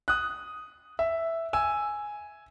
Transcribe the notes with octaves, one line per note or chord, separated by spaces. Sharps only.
D#6 F#6
E5
G#5 E6